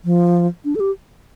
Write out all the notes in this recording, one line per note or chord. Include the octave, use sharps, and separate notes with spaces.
F3
D4
A4
G4